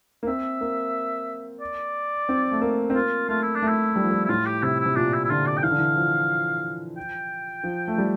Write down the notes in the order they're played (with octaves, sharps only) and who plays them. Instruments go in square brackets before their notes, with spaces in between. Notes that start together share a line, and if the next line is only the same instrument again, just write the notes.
[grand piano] A#3
[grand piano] C4 [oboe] E5
[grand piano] A#3
[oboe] D5
[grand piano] C4
A3
A#3
C4
[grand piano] A#3 [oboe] F4
[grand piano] A3 [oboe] F4
[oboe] E4
D4
[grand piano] A3
[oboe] E4
[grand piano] G3
F3
G3
[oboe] E4
[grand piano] A2 [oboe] F4
[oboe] G4
[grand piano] C3 [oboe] E4
[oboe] E4
[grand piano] C3
[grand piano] A#2 [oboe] D4
[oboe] E4
E4
[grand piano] D3 [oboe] F4
[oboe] D5
G5
[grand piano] E3 [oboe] F5
[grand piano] D3
E3
F3
[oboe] G5
[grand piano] F3
A3
G3